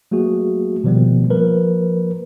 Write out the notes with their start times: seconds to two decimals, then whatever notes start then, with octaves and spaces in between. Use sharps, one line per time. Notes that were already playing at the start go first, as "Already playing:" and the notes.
0.11 F#3 A3 A#3 F#4 G#4
0.84 B2 D#3 F3 G3 A3 B3
1.30 F3 A#3 A#4 B4